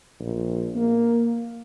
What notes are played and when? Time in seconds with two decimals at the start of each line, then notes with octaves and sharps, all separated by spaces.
0.20 A#1
0.76 A#3